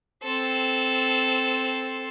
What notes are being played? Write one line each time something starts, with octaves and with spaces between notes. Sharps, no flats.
C4 A4